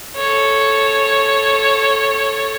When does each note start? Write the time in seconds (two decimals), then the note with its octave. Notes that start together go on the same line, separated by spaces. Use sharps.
0.16 A4 C#5